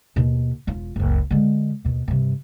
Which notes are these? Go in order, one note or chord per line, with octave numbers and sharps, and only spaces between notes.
D#2 B2
E1 F4
F#1 C#2
D3 G#3
D#2 B2
G2 C3